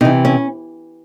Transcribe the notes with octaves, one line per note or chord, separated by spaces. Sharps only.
C3 E3 D#4
C#4